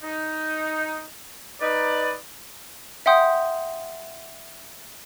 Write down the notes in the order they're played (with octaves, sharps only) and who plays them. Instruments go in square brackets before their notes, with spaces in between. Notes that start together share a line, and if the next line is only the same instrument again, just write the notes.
[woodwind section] D#4
D#4 B4 D5
[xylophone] E5 F#5 G5 C6 D#6 G6